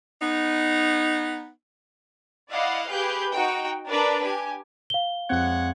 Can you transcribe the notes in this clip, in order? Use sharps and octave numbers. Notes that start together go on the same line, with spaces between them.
B3 D#4
E4 D5 D#5 F5 F#5
G4 G#4 B4 G6
D#4 F#4 G5
D4 A#4 B4 D5
G4 G#5
F5 G7
F2 G#3 C4 C#5 F#5